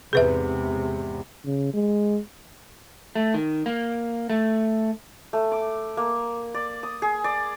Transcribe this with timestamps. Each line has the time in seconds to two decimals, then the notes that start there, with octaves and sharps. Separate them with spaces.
0.13 E2 G#2 C3 G#4 B4 E5
1.46 C#3
1.74 G#3
3.15 A3
3.34 D#3
3.66 A#3
4.30 A3
5.33 A3
5.52 D6
5.97 A#3
6.54 D5
6.83 D#6
7.02 G#4
7.24 D5